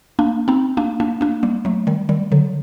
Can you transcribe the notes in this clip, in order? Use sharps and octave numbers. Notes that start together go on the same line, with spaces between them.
A#3 D4
C4 D#4
A#3 D4
A#3 D4
A#3 D4
G3 A#3
F#3 A3
D#3 G3
D#3 G3
D3 F#3